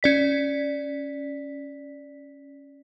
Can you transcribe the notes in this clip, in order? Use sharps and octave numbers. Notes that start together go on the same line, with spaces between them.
C#4 D5 B6